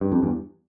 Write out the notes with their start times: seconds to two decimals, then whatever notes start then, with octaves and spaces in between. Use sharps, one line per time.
0.01 G2
0.12 F2
0.22 E2 G2